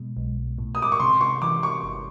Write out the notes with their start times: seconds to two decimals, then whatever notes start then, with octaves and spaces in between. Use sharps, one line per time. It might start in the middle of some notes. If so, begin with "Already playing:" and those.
Already playing: B2 G#3
0.17 B1
0.58 A2
0.75 D#6
0.82 D6
0.92 C#6
1.00 C3 C6
1.21 C#6
1.42 E3 D6
1.63 C#6
1.83 G1